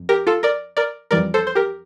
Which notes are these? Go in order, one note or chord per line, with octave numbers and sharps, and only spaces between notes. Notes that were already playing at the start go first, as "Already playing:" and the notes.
Already playing: F2
G4 A#4
F4 A4
A#4 D5
A#4 D5
F2 E3 G3 A#4 D5
A4 C5
C5
G4 A#4